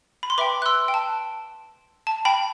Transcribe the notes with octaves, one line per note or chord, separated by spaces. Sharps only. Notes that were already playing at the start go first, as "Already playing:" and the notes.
B5
C6
B4 E5 G5 B5 D6
F#6
C6 E6
G5
A5
A5
G5 B5